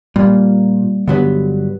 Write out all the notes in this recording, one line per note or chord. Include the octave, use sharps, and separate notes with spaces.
A#2 G3 A#3
G2 D3 F#3 B3